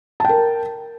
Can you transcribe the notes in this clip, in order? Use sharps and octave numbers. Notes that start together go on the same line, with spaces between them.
A#4 G5 A5